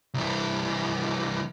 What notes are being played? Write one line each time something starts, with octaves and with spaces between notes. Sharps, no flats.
C2 E3